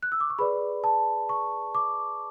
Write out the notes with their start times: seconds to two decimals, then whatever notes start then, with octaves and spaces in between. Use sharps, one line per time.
0.03 F#6
0.12 E6
0.21 D6
0.30 C#6
0.39 G#4 B4 D5 B5
0.84 A5
1.29 C#6
1.75 D6